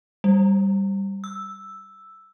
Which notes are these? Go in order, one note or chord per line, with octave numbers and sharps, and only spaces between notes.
G3
E6